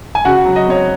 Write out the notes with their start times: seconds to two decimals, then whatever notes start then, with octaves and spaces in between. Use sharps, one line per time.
0.15 G#5
0.25 C#3 F#4 F#5
0.45 F#3
0.56 D#5
0.66 C4 C#5